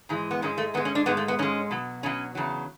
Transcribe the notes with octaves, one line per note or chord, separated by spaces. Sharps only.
G#2 E3 G#3
B3
G#2 G#3 C#4
A3
G#2 G#3 B3
C#4
D4
G#2 G#3 B3
A3
B3
G#2 G#3 C#4
B2 F#3
B2 F#3 C#4
E2 C#3 F#3